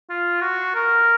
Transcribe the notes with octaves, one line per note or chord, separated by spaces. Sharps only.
F4
F#4
A#4